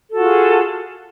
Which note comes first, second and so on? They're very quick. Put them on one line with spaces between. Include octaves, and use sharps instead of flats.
A4 F#4 F4 G#4